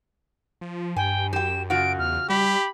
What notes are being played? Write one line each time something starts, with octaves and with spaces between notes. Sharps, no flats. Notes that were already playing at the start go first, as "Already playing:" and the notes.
F3
G2 G5 G#5
F#2 G4 G5 E7
C#3 F4 F#4 D7
E2 F6
G3 G4 B5